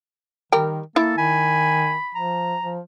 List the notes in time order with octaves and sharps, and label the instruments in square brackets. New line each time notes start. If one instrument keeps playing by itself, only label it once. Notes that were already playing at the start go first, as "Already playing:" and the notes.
[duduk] D#3 [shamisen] G3 A#4 G5
[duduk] A#3 [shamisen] E4 [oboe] A4
[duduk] D#3 [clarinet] G#5 [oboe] B5
[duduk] F3 [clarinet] A#5
[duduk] F3